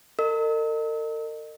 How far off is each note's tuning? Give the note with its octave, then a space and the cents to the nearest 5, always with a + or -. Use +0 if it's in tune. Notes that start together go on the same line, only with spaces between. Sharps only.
A#4 -45 D#5 -30 E6 -45